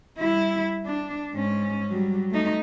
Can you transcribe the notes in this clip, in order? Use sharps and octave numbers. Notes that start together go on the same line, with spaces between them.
G3 E4
D4
G#2 C#4
F#3 G3
A3 D#4